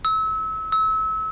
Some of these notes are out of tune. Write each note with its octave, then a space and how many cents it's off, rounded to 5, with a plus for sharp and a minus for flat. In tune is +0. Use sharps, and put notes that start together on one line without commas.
E6 -30
E6 -30